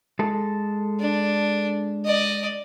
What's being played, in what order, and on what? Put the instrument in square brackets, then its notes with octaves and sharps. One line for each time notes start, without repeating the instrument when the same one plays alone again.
[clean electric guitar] G#3 A4
[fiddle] D4
D5 D#5